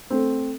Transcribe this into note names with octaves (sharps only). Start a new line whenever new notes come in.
A3 C4